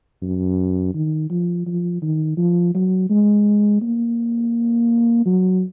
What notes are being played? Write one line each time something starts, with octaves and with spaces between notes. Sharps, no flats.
F#2
D#3
F3
F3
D#3
F3
F#3
G#3
A#3
F#3